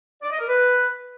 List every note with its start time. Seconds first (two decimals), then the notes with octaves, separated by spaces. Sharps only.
0.22 D5
0.31 D#5
0.39 A#4
0.47 B4